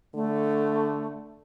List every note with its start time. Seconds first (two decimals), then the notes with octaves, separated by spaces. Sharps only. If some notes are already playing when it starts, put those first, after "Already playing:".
0.15 D3 A3